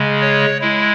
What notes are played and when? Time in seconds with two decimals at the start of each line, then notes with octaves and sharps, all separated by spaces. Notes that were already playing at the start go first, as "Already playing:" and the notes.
Already playing: C#3 G#3
0.21 C#5
0.61 G#3 E4